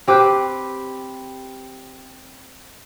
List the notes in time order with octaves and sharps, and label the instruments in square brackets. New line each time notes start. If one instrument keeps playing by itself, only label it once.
[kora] C4 G4 B4